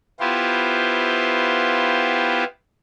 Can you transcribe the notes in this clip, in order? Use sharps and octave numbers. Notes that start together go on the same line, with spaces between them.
B3 E4 F4 G4 C5